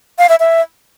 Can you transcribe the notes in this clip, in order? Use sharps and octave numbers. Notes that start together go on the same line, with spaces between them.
F5
E5
E5